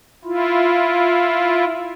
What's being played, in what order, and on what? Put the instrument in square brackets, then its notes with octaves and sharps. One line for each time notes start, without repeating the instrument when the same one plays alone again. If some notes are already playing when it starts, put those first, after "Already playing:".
[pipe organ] E4 F4